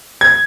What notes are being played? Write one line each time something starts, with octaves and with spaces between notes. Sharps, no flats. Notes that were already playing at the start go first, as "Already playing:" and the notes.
G#6